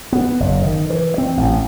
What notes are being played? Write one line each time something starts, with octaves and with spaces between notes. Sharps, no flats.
B3
F#1
D#3
E3
C4
A1